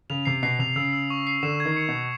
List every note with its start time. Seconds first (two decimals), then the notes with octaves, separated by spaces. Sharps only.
0.10 C#3 F7
0.25 C3 C7
0.43 B2 C7
0.59 C3 F7
0.76 C#3 E6
0.93 E6
1.10 C#6
1.27 C7
1.43 D3 E7
1.60 G#6
1.65 D#3
1.77 C#7
1.88 B2 C#7